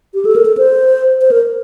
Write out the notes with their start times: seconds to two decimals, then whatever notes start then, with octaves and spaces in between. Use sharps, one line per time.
0.14 G4
0.25 A4
0.36 A#4
0.46 A4
0.57 C5
1.21 C5
1.31 A#4